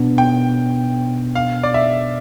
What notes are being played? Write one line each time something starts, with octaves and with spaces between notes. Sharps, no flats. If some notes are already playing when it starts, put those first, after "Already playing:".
Already playing: B2 B3 D4
G5
F5
D5
E5